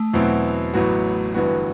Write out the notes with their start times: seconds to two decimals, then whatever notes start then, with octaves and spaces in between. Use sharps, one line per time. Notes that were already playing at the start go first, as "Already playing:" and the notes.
Already playing: A3
0.14 E2 B2 F#3 C4 E4
0.74 A1 A2 F#3 B3 F#4
1.34 G1 G2 E3 B3 F#4